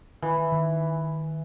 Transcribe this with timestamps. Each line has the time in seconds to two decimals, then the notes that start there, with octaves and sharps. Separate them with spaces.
0.22 D#3 E3
0.37 D#3
0.52 D#3